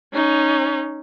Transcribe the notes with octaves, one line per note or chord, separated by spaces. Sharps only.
C#4 D#4